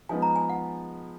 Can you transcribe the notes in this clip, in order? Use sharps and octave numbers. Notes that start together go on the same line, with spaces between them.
F3 G#3 B3 D#4 G#5
A#5
G#5
F#5